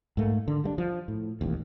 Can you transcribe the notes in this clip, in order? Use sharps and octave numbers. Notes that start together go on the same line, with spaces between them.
G#2 A3 A#3
D3
G3 A3 D4
F3
A2
E1 A1 D#2